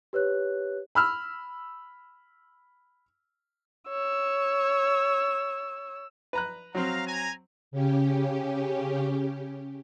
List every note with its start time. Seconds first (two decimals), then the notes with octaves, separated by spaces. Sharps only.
0.13 G4 B4 C#5 F#6
0.95 B5 E6 F6
3.89 C#5 E6
6.33 B4 A#5 F#6
6.75 F#3 C4 F5 A#5
7.07 G#5 A#5
7.71 C#3 C#4 G4